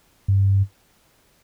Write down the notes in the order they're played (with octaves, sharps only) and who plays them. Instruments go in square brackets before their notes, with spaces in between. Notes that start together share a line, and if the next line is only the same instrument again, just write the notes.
[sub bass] G2